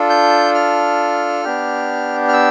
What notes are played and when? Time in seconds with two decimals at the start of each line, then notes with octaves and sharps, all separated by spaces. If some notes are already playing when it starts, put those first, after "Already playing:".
Already playing: D4 F4 A4
0.10 G6
0.55 F6
1.44 B3 D4 G4
2.28 F6
2.33 E6